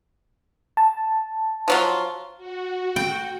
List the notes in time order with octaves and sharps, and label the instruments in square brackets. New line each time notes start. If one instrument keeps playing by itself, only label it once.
[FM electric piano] A5
[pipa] F3 F#3 F4
[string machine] F#4
[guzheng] G5